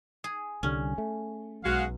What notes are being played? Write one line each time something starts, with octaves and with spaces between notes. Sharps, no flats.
G#4
C2 D3 G3 C#4
A3
B1 G#3 F#4 F5